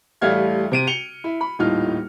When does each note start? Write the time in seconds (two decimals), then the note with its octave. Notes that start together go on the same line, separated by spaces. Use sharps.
0.21 A1 G3 A3 F5 F6 G#6
0.72 C3 D7 D#7
0.87 C#7 F7 G7
1.24 E4
1.41 B5
1.59 D#1 A2 D#4 F4 F6